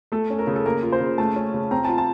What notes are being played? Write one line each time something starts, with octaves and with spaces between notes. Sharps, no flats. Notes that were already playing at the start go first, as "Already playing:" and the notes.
A3 A4
C#4
A#4
C#3
A4
A#3 A#4
F4
C5
C#3
A3 A5
C#4
C#3
C4 A#5
F4 A5
A5